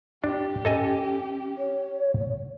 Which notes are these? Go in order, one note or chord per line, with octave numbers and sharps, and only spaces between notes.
D4 G4
C#4 A4 D#5 G#5
C#5